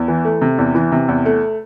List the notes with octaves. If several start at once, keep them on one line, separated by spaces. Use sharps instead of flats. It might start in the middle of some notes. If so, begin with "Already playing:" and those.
Already playing: E2
E3
A3
C3
E2
E3
C3
E2
A3